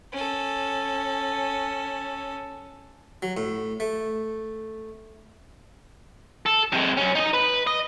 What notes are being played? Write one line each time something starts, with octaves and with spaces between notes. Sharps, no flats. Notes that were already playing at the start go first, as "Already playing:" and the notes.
C#4 A4
F#3
A2
A3
A4
C3 G#3
F#2 C#4
D#4 D#5
B4
D#5